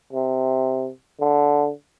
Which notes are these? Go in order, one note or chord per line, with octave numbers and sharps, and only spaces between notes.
C3
D3